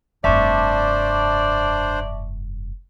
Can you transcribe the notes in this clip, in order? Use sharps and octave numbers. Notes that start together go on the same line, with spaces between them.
F1 G2 D4 C5 D5 E5 A5 C#6